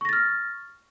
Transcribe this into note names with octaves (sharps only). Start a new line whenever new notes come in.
C#6 F6 A6 A#6